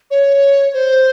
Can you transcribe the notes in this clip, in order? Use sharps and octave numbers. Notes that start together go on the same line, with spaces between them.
C#5
C5